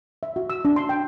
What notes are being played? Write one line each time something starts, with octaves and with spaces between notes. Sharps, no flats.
E5
F#4
E6
D4
C6
G5